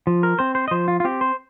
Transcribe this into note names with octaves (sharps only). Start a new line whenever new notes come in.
F3
A#4
C4 C5
C5
D#5
F3 C5
F4
F4
C4 G4
C5